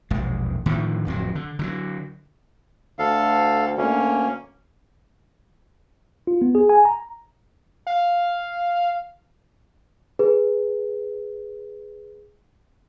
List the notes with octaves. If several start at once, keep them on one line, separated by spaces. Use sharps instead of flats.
E1 A#1 G#3
A2 D3 D#3 F3
D1 F2 F#3
D3
D3 E3 F#3
D2 A4 F5
D2 A#3 C#4
F4
B3
G#4
G#5
A#5
F5
G#4 B4